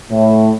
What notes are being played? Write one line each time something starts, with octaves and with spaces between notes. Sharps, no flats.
A2